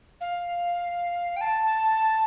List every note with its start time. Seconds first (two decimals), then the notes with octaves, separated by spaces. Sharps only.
0.21 F5
1.36 G5
1.41 A5